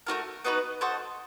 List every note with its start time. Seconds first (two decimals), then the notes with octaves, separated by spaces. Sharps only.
0.06 A3 D4 F#4 A#4
0.44 B3 D#4 F#4 B4
0.81 F#4 A4 C5 D#5